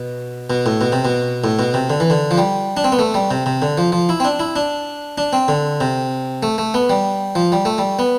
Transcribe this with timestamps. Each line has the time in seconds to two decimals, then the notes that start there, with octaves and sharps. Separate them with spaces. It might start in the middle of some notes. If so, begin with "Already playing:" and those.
Already playing: B2
0.50 B2
0.66 A2
0.81 B2
0.92 C3
1.05 B2
1.44 A2
1.59 B2
1.74 C3
1.90 D3
2.00 E3
2.10 D3
2.31 F3
2.37 G3
2.77 D4
2.84 C4
2.92 B3
2.99 A3
3.14 G3
3.31 C3
3.46 C3
3.62 D3
3.78 F3
3.92 F3
4.09 E4
4.20 C4
4.25 D4
4.40 E4
4.56 D4
5.18 D4
5.33 C4
5.48 D3
5.81 C3
6.43 A3
6.58 A3
6.74 B3
6.90 G3
7.35 F3
7.52 G3
7.65 A3
7.78 G3
7.99 B3